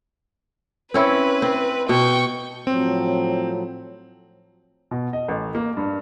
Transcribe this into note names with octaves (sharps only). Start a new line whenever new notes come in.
C4 C#4 E4 B4
C4
B2 G5 C#6
A2 F3 F#3 C4
B2
D#5
A1
A#3
G2